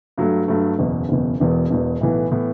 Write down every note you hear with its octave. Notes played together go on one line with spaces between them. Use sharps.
G2 F#3 A3
G2 F#3 A3
F#1 E2 B2
F#1 E2 B2
E1 E2 B2
E1 E2 B2
B1 A2 E3 B3
A2 E3 B3